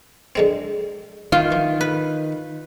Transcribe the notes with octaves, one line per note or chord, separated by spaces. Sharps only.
D3 G#3 C4
D#3 F4
E3
B4